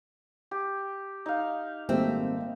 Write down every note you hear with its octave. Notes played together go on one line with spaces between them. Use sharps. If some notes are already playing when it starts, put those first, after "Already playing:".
G4
D#4 F5
G#1 G3 A3 A#3 C4 E5